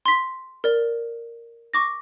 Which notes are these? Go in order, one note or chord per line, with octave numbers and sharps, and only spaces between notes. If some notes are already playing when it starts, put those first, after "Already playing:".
C6 B6
A#4 D5
C#6 D6 A#6